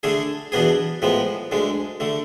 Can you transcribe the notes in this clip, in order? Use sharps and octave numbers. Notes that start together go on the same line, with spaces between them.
D3 A3 D4 G#4
E2 B2 B3 D4 G#4
A2 F3 G#3 B3
D2 D3 G#3
D3 A3